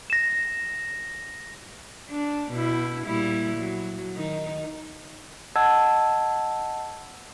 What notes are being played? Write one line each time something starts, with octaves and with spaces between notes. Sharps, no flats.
A#6 E7
D4
B2 E4
A#2 G3 E4
F#3
D#3 D#4
D#5 F#5 A5 E6 G#6